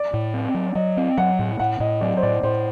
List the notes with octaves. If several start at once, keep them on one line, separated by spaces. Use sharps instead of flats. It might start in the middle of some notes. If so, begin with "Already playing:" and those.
Already playing: D5
A2
C4
F#3
F#3 D#5
C4
F#3 F#5
A2
A2 F#5
A2 D#5
F#3 D5
C5
A2 D5
A2 C5